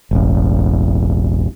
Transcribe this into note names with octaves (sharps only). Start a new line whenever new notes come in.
E1 A1